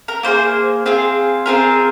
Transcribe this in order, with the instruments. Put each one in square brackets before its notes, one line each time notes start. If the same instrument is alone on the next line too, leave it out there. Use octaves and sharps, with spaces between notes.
[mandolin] A#4
A#3 F4 G#4 C5
C4 F4 G#4
C4 F4 G#4 A#4